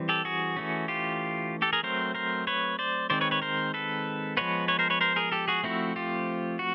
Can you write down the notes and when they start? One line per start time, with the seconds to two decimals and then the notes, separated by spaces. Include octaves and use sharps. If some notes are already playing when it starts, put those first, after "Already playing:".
Already playing: E3 G3 C4
0.09 G4 A4
0.25 F#4 G#4
0.57 E3 A3 C#4
0.88 F4 G4
1.62 G4 A4
1.73 G#4 A#4
1.83 F#3 A3 C4 A#4 C5
2.15 A#4 C5
2.47 B4 C#5
2.79 C5 D5
3.10 D#3 G#3 C4 C5 D5
3.21 B4 C#5
3.31 B4 C#5
3.42 A#4 C5
3.74 A4 B4
4.37 F3 G#3 B3 B4 C#5
4.68 B4 C#5
4.79 A#4 C5
4.90 B4 C#5
5.01 A#4 C5
5.16 G#4 A#4
5.32 G4 A4
5.48 F#4 G#4
5.63 F3 A3 C4 E4 F#4
5.96 F4 G4
6.59 F#4